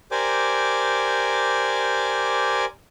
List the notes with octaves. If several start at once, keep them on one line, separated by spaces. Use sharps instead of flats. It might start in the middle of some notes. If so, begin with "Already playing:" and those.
G4 A#4 C5 D5 G#5 D6